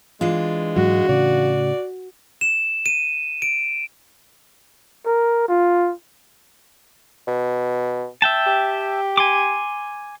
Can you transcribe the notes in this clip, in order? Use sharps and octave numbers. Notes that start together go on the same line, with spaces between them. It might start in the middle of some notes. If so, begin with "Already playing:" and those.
E3 G#3 D4 F4
G#2 F#3 F#4
A2 C#3 D5
E7
D#7
D7
A#4
F4
B2
E5 G5 A5
G4
G#5 C6 D6